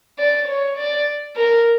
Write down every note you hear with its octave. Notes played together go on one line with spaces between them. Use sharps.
D5
C#5
D5
A#4